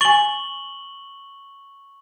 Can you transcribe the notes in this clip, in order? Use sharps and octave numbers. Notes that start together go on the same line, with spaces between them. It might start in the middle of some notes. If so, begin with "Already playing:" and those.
G#5 C#6 A6 F#7 G7